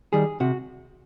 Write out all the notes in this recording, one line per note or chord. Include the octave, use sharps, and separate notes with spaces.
D#3 G3 G#4
C3 F#4